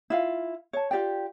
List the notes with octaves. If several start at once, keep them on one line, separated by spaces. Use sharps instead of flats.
E4 F4 F5
C#5 A5
F4 G4 D5 G5